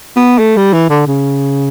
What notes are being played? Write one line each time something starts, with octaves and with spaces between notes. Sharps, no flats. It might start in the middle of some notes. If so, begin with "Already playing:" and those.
B3
A3
G3
E3
D3
C#3